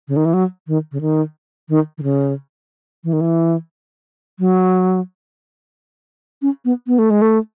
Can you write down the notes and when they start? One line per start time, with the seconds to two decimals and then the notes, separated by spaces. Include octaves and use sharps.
0.08 C#3
0.16 D#3
0.25 E3
0.33 F#3
0.67 D#3
0.92 C#3
1.01 D#3
1.69 D#3
1.98 D#3
2.03 C#3
3.04 E3
3.13 D#3
3.21 E3
4.39 F#3
6.42 C#4
6.65 B3
6.87 B3
6.98 A3
7.10 G#3
7.22 A3